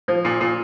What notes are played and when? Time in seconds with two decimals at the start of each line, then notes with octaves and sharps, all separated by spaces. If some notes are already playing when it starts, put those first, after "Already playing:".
0.08 F3
0.25 A#2
0.41 A#2